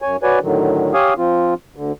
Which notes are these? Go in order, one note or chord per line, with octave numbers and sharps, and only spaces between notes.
F#2 C#5 G#5
F#4 B4 C#5 D5 G#5
A2 D3 D#3 F#3
G4 C#5 F5 G#5 D#6
F3 C4 F4
D2 D3